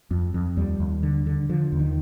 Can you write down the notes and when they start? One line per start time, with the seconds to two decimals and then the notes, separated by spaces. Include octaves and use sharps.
0.11 F2
0.34 F2
0.57 D#2 G3
0.80 D#2
1.03 D3
1.27 D3
1.49 D3 F3
1.72 D#2
1.79 D#3